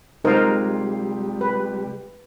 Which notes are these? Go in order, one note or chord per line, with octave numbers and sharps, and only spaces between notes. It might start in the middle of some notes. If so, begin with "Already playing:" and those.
C3 G3 G#3 D#4 F4 A#4 C5
B4